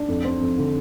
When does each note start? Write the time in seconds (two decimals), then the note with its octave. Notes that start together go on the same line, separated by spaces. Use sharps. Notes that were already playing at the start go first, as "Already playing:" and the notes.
Already playing: D4
0.08 F2
0.24 C4
0.41 F2
0.58 D3